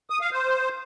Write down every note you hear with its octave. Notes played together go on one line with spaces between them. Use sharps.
D#6
F5
C5